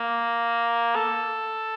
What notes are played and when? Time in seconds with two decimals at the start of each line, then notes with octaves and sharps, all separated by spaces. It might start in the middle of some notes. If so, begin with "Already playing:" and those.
Already playing: A#3
0.96 A4